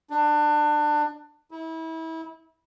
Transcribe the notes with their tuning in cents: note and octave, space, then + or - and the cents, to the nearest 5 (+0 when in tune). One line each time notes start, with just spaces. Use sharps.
D4 +25
E4 -30